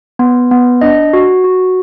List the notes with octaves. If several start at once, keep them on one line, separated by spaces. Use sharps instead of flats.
B3
B3
D4 D#5
F#4
F#4